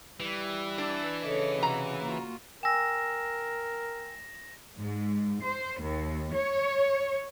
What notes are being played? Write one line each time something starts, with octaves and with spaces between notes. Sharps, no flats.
E3 G3
D4 E6
C#3 A4 C#5 D#5
C3 F#4 A#5
A#3 F4 F#4
A#4 G5 G#5 E6 A#6 E7
G#2
C5
D#2
C#5